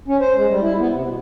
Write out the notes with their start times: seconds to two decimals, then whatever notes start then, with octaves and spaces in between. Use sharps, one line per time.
0.08 C#4
0.21 C5
0.36 G#3
0.48 G3
0.61 E4
0.79 B3
0.93 C3
1.07 B2